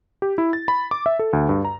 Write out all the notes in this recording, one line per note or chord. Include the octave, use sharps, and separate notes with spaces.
G4
E4
A6
B5
D6
E5
A4
D2
G2
A#5